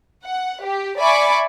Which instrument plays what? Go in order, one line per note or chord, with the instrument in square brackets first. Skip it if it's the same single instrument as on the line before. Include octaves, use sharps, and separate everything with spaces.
[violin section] F#5
G4
D5 E5 G#5 B5 C#6 D6